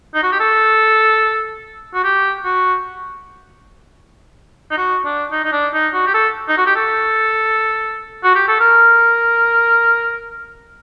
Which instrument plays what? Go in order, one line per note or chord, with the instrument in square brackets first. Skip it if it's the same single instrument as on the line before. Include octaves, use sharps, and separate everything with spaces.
[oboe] D#4
F#4
G4
A4
F#4
G4
F#4
D#4
F#4
D4
D#4
D#4
D4
D#4
F#4
G4
A4
D#4
F#4
G4
A4
F#4
G4
A4
A#4